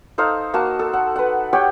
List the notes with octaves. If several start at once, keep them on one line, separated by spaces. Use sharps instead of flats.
D#4 A4 C5 F5
A#3 F#4 A5
A4
F#5
B4 F#5
G4 C#5 F#5 G5